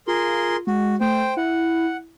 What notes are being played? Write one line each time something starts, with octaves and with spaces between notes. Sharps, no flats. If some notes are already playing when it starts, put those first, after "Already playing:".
F4 G#4 A#4 C6
G#3 F#4
A3 C5 G5
E4 F#5